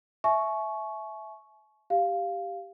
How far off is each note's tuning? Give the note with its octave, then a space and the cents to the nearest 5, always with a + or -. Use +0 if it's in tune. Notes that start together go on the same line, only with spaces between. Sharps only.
E5 +0 G#5 +45 C#6 +0
G4 +0 F5 +0